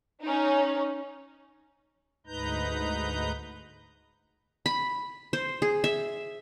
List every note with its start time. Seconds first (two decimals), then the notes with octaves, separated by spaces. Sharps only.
0.24 C#4 D#4
2.27 D2 G#2 D#4 B4 A#5 G6
4.66 B5
5.33 C5
5.62 G#4
5.84 E5